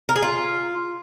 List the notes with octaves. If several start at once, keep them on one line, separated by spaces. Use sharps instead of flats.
A#4
G#4
F4